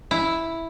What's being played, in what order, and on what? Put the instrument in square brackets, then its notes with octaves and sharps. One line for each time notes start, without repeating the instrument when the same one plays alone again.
[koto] E4